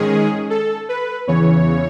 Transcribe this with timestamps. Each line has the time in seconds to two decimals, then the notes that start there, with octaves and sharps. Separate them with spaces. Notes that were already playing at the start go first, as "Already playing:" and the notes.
Already playing: G#2 D#3 G#3 C#4 G#4
0.50 A4
0.89 B4
1.27 E2 C#3 E3 C#5